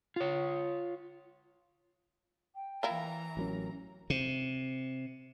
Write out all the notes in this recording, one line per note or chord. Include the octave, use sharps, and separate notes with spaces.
F4 C#5
G5
E3 A#3 E4 F4 A#5
A1 F#3 C#4 A#4
C3